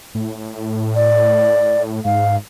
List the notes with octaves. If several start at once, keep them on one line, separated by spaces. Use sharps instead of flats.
A2
D5
G#2 F5